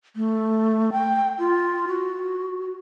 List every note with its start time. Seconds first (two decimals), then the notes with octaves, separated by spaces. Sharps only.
0.16 A3
0.92 G5
1.39 F4
1.88 F#4